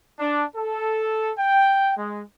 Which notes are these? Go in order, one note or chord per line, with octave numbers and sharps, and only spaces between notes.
D4
A4
G5
G#3